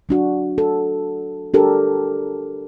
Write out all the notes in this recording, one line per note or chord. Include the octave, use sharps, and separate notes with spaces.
F#3 D4 F#4
A4
D4 G4 A4 A#4